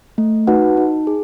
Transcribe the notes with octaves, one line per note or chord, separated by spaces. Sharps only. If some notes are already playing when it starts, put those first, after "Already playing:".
A3
D#4 F#4 B4 F#5
D#4
G#4